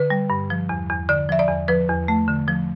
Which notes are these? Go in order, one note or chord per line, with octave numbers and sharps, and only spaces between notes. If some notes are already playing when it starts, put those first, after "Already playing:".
Already playing: D3 B4
G3
G2
F3
E2
E2
D3 D5
F3 E5
D5
E2
F3 B4
E2
A3
D3
F3